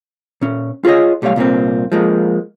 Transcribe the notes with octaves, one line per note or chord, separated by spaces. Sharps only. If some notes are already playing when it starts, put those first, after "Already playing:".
A#2 C#4
F4 G#4 A4 C#5 D#5
B1 G3 A3 C#5 F5
C2 A#2 A#3 C4
F3 G#3 A#3